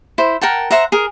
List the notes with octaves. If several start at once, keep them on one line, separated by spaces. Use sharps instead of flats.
E4 C5
A#4 F#5 G5 A5
C5 E5 F#5 A#5
G#4 A#4